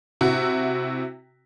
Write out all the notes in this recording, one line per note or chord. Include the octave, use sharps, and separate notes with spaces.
C3 E4 F#4